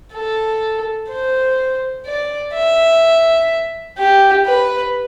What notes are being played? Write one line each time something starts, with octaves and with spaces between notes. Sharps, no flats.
A4
C5
D5
E5
G4
B4